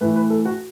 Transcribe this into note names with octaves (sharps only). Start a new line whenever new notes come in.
A2 E3 A3 B4
B4
A4
F#4